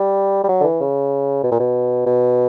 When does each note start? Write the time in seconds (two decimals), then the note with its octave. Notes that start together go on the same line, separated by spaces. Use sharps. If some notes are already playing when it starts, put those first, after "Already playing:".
Already playing: G3
0.44 G3
0.49 F#3
0.61 D3
0.64 E3
0.80 C#3
1.43 B2
1.51 A#2
1.60 B2
2.06 B2